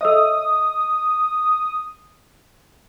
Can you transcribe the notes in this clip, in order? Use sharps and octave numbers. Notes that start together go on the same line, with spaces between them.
A4 C#5 D#5 E5 D#6 E6